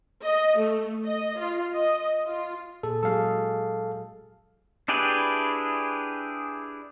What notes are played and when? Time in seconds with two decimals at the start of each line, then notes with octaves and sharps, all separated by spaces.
0.23 D#5
0.57 A3
1.05 D#5
1.38 F4
1.74 D#5
2.27 F4
2.83 A#2 G#4 A4
3.03 F#3 G#3 G#4 A4 F5
4.88 D4 E4 G4 G#4 B4